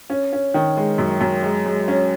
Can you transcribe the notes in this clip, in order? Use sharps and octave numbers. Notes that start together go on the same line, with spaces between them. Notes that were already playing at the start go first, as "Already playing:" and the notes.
C#4
C#4
D#3
G#3
F#2
F#2
G#3
G#3
C#4